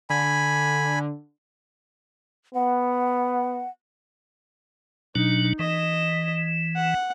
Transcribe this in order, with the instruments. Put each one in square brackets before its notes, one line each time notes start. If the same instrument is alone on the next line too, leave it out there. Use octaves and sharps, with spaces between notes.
[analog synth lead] D3 [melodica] G#5 B5
[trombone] B3 [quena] F#5
[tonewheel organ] B2 F#3 D4 [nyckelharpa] D#4
[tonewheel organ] E3 [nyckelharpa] D#5
[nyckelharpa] F#5